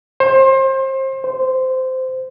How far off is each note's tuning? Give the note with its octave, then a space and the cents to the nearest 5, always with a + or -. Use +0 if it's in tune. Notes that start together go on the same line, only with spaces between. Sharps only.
C5 +30
C5 -15